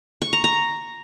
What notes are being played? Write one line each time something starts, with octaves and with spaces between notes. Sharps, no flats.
C#6
A#5
A#5